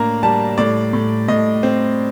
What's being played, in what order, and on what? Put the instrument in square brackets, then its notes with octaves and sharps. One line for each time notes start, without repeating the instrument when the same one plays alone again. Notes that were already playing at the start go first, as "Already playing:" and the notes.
Already playing: [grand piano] A2 A#3 D4 A#5
G3 A5
A2 D5
A2
A2 D#5
C4